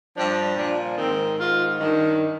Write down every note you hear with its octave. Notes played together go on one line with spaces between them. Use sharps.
G2 F3 D4
A#2 F3 D4
G#2 D#3 C4
G#2 D#3 F4
G2 D#3